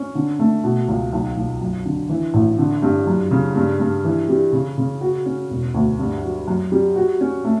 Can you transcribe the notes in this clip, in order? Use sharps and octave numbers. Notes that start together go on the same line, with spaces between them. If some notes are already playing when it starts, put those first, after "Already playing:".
Already playing: C#4
D3
A3
B2
C#2
B1
B1
F#2
D3
E3
A1
D3
G2
F#2
C#3
G2
G2
E3
G3
C#3
C#3
F#4
C#4
E1
D2
G2
F#3
F#2
G3
F#4
C#4
A3